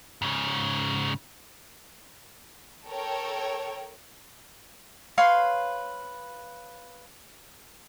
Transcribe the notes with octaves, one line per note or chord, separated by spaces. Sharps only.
G#2 C#3
A4 A#4 C#5 G5
B4 C#5 F5 C6